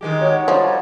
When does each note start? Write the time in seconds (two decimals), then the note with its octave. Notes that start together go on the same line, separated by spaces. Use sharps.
0.01 D#3 G#3 G4
0.21 D#4 F#4 C#5
0.48 F3 G3 A5